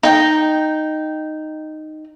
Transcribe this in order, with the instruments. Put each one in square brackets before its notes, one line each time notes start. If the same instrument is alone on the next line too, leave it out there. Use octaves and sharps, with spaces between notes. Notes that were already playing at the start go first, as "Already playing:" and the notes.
[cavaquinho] D#4 G5